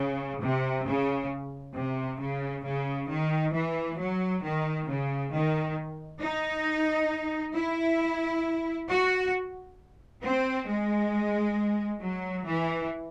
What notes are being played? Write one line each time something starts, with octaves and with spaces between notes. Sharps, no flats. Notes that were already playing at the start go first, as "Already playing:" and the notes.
Already playing: C#3
C3
C#3
C3
C#3
C#3
D#3
E3
F#3
D#3
C#3
D#3
D#4
E4
F#4
C4
G#3
F#3
E3